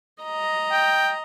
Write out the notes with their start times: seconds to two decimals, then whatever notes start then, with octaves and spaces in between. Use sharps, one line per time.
0.23 D#5 A#5
0.71 G5